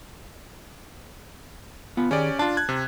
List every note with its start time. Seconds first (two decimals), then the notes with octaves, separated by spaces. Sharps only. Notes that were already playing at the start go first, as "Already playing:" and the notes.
1.97 B3 F4
2.11 D#3 C#4 G4 G#4 D5
2.39 D4 F4 A5
2.57 F#6 G#6
2.69 C3